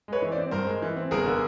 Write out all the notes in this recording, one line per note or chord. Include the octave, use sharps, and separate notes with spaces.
G#3 B4 C#5
E3
C5 D5
C4
G2 A#4 C5
G#3
E3
C4
G1 G#4 A#4
D3